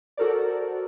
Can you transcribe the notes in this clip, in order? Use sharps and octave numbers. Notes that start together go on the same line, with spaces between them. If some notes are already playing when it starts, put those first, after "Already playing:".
F#4 A4 A#4 C5 D5